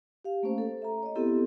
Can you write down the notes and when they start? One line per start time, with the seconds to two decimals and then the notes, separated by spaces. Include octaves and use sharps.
0.24 G4 F5
0.43 A3 A#3 C#4 C5
0.58 A4
0.82 E5 A#5
1.03 C#5 D#5
1.15 B3 C4 E4 G4 A4